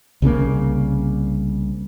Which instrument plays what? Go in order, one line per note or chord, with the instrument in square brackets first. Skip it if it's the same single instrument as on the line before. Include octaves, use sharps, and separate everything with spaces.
[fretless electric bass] C2 C#3 F3 A#3